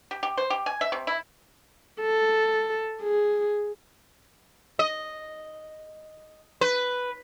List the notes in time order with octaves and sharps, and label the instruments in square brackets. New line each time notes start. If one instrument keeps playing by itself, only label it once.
[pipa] G4
G4
C5
G4
G#5
E5
C3
E4
[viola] A4
G#4
[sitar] D#5
B4